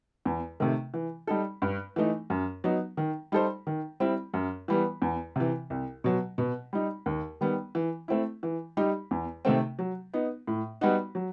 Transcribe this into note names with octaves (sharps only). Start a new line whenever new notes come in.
E2
C3 D#3 A3
E3
G3 D#4 A4
G2
E3 A3 D#4
F#2
F#3 B3 D#4
D#3
G3 D#4 A4 C5
D#3
G3 C4 E4
F#2
E3 G3 B3
E2
C3 E3
C2
B2 F#3
B2
G3 D#4
D#2
D#3 G3 B3
E3
A3 C4 E4
E3
G3 D#4 G4
E2
C3 D#3 A3 C4
F#3
B3 D#4
A2
G3 B3 D#4 F#4
F#3